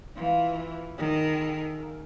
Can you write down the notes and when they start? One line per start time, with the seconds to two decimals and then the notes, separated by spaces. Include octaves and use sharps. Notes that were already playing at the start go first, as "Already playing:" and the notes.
0.16 E3 F4
0.58 E4
0.98 D#3 G#4
1.40 A4
1.80 A#4